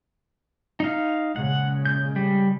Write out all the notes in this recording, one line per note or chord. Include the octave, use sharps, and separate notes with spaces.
D#4 F5
A#2 C#3 G#3 F#5
G6
G3